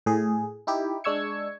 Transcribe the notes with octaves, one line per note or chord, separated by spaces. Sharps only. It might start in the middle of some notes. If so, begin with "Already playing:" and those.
A2 G#4
D#4 E4 G4
G#3 D4 C#6 E6 G#6 C#7